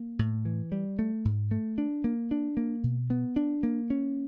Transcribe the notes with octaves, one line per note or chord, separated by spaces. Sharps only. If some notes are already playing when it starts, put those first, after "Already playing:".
Already playing: A#3
A2
E3
G3
A3
G#2
A3
D4
A#3
D4
A#3
B2
B3
D4
A#3
C#4